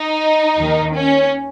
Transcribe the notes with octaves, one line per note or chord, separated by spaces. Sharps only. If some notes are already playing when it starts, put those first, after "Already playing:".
Already playing: D#4
D#2 D#3
C#4